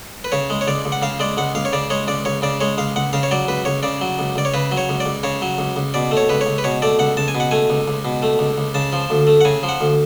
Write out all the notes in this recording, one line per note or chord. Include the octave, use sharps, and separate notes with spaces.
B4
C#3 C#5
G#3
C#5
C#2 D5
C#2
F#5
C#3 F5
G#3 D5
C#2 F#5
C#2 F5
C#5
C#3 D5
G#3 C#5
C#2 D5
C#2 C#5
C#3 D5
G#3 C#5
C#2 F5
C#2 F#5
C#3 F5
C#5
F#3 D5
C#2 B4
C#2 C#5
C#3 D5
F#3
C#2
C#2 D5
C#5
C#3 B4
F#3
C#5
C#2
D5
C#2
C#3 C#5
F#3
C#2
C#2
B2 D5
A3
C#5
C#2 B4
C#5
C#2
B4
B2 C#5
A3 D5
C#2 F#5
C#2 A5
G#5
B2
F#5
A3 G#5
C#2
C#2
B2
A3
C#2
C#2
C#3 A5
F3
D2
A3
F#5
C#3 G#5
F3
F#5
D2